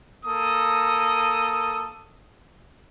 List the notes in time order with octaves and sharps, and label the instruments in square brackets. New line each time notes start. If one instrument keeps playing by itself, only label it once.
[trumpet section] A#3 A4 D#6